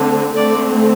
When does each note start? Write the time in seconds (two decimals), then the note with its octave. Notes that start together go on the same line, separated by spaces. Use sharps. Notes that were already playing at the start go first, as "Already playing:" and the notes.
Already playing: D3 A3 C4
0.36 D3 A3 C4 D5